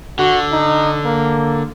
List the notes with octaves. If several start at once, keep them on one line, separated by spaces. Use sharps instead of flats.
D3 F#4
D#4
A#3